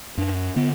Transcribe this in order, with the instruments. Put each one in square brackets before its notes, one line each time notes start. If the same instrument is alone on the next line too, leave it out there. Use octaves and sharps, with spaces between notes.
[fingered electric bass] F#2 D4
D3 B3